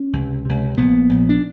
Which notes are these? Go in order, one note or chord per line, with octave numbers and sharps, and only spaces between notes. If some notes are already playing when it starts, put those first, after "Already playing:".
Already playing: C#4
C#2 C3
C#2 C3
A#1 A#2 B3
A#1 A#2
D4